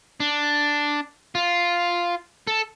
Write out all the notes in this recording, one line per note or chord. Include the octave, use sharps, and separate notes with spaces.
D4
F4
A4